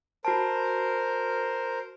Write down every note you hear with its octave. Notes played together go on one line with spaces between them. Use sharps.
F#4 A#4 C5 A5